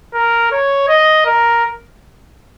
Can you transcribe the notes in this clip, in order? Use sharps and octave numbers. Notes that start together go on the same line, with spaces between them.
A#4
C#5
D#5
A#4